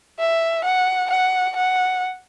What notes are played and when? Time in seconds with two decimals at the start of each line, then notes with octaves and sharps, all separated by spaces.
0.19 E5
0.65 F#5
1.11 F#5
1.56 F#5